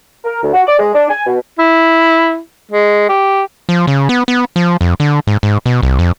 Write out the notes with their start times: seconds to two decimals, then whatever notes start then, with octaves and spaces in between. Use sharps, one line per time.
0.25 A#4
0.41 D2
0.53 F#4
0.67 D5
0.78 G#3
0.94 D4
1.09 G#5
1.26 B2
1.59 E4
2.71 G#3
3.09 G4
3.69 F3
3.87 C#3
4.09 B3
4.28 B3
4.56 F3
4.81 F2
5.00 D3
5.27 G#2
5.43 G#2
5.66 B2
5.83 C2
5.99 F2